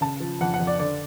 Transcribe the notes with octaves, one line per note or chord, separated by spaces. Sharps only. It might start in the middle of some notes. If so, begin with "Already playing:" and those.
C#3 A5
F3
F2 F#5
F#5
F2
D5
D3 D5